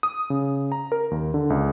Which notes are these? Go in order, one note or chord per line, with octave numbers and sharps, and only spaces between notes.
D#6
C#3
A#5
A#4
D#2
D3
C#2